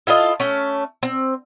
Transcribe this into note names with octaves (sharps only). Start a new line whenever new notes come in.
E4 F4 A4 D#5
A3 C#4
C4